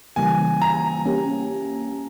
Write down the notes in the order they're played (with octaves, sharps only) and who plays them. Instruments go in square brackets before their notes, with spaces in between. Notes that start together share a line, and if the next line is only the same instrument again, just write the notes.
[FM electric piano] C#3 E3 G3 A#3 [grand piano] G#5
[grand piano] A#5
[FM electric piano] A#3 C#4 G4